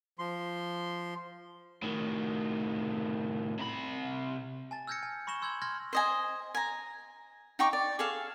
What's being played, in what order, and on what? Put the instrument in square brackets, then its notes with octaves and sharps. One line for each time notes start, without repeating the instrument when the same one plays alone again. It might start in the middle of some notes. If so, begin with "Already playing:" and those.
[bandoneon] F3 C6
[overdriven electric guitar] A2 D#3
C3 B5
[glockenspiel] G#5 A5 A6
E6 F6 G6 G#6 A#6 C#7
G#5
B5 C#6 A#6 E7 G7
C6 E6 G6 G#6 F#7
C6 F6 G#6 A#6
[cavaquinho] C5 D#5 G#5
G#5 A#5
D#4 G5 C#6 D6
D5
G#4 A4 F5